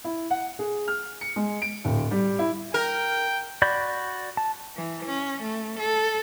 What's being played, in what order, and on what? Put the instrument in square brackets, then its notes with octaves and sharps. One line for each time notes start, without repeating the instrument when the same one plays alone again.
[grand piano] E4
F#5
G#4
F6
C#7
G#3
D7
D1
G3
E4
[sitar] A#4 [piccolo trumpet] G5
[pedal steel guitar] F#4 D5 B5 G6
A5
[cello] E3
C#4
A3
A4